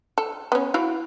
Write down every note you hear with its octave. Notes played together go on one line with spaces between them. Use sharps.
A4
B3 C#4
E4 F#4 F5